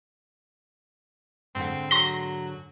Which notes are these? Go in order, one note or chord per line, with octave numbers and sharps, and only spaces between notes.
G#2 D3 C4 F#5
F#3 C6 A#6 G7